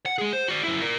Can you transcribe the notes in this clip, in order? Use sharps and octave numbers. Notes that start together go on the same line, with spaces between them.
F#5
G#3 G#4
C5
F#4 D5
F#2 E4
A#4 D5